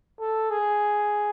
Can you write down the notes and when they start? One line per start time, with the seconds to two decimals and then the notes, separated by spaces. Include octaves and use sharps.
0.20 A4
0.50 G#4